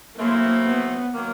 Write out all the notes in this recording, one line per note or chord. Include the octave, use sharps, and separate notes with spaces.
B2 F#3 A3 A#3 C4 E4
B3
D#3 F#3 A#3